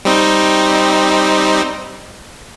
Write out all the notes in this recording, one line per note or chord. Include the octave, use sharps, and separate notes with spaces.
G3 C4 D#4